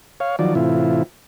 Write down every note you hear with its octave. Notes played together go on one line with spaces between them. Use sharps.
C#5 F5
D#3 F3 F#3 D5
A2 C3 E3 E4 F4